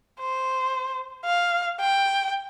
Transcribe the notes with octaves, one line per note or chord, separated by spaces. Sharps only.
C5
F5
G5